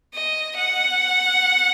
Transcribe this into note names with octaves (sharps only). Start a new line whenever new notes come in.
D#5
F#5